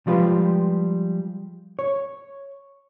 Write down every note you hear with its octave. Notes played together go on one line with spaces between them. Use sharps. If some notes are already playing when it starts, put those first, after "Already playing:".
F3 G3 G#3 F4 G4 B4
C#5